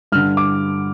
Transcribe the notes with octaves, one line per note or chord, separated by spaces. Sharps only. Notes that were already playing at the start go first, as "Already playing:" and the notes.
G2 D3 F6
D6